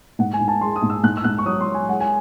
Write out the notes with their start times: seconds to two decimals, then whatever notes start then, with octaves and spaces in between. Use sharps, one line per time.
0.19 G#2 F#5
0.33 G#5
0.41 G#2
0.48 A5
0.61 G#3 C6
0.76 D#6
0.83 G#2
0.90 E6
1.04 G#2 F#6
1.17 E6
1.24 G#2 F#6
1.38 C#6
1.46 F#3 D#6
1.61 C6
1.67 F#3
1.74 G#5
1.89 G#3 F#5
2.00 G#5